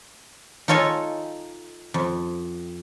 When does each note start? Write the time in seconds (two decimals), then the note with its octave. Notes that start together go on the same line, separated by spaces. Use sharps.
0.68 D#4 F4 A4 C#5 D#5 G#5
1.94 F2